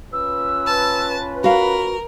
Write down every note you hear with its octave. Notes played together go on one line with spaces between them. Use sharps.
C#4 F4 B4 E6
A5
F#4 A#4 F5 B5